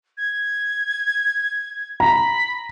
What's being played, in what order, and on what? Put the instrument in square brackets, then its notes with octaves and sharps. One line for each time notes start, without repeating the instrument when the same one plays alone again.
[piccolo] G#6
[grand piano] A#5 [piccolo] B5